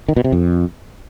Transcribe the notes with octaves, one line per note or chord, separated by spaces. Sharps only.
D#3
B2
C3
F2